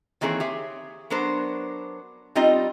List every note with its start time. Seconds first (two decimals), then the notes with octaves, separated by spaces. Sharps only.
0.21 D#3 E3 A#3 C4 G#4 C#5
0.40 G4 G#4 C#5 E5
1.10 F#3 B3 D4 A#4 C5
2.35 G3 C4 D#4 F4 D#5